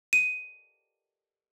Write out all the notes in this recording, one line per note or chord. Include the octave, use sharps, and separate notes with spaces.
D#7